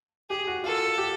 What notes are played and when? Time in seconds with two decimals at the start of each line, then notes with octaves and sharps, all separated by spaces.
0.30 G4 G#4
0.47 F#4
0.64 F4 A4
0.98 G4